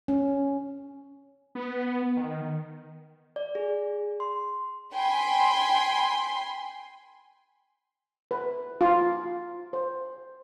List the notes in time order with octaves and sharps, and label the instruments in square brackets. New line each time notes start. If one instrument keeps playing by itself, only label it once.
[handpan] C#4
[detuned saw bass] B3
D#3
[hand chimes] D5
G#4
C6
[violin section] G5 G#5 B5 C6
[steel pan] B4
F4
C5